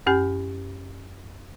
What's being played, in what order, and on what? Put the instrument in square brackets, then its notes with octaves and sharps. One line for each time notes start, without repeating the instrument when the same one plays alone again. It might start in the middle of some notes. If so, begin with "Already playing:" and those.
[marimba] F#2 C#4 G4 G#5 G6